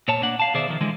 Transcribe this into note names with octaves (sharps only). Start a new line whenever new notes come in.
A#2 C#5 A5
A#3 D4 F#5
F5 A5
B2 D#3 G#4 C5 D5 E5
D#3 F3
D3 E3 G#3